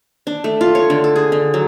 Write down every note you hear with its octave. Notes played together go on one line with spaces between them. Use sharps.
D4
A3
F4
C#5
D3
A4
G#4
D3
F#3